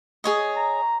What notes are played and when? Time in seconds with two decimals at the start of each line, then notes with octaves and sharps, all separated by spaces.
0.24 G#4 C#5 D#5
0.57 A#5